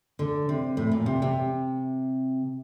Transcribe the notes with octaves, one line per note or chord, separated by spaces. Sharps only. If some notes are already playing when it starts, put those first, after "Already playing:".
D3
C3
A2
A#2
C3
C3